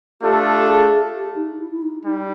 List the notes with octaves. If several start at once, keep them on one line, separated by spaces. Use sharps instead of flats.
A3 D4 F4 G4 A4
G#4
G4
D#4
E4
E4
D#4
G3 D#4